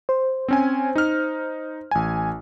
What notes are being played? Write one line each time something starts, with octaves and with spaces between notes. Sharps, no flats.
C5
C4 C#4 G#5
D#4 F6
A1 G#5